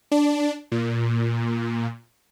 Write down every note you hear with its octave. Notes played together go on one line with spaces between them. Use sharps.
D4
A#2